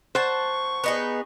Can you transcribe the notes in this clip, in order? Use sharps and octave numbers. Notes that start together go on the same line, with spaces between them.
C5 F#5 A5 C#6
B3 D#4 G#4